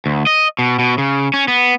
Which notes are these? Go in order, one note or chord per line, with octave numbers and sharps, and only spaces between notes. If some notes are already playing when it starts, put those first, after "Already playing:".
D2
D#5
B2
B2
C#3
C#4
B3